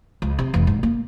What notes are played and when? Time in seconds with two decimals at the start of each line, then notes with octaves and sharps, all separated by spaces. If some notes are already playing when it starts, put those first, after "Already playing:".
0.22 C#2
0.39 C3
0.54 F1 E3
0.67 G#2
0.83 A#3